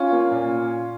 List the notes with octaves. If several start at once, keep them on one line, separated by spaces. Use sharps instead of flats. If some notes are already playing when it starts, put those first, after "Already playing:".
Already playing: C#4 F4
A#3
A#2